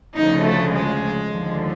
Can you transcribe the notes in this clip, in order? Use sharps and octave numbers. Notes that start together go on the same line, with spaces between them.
D2 C#3 F3 D#4
A3
G#3
D#2 D3 F3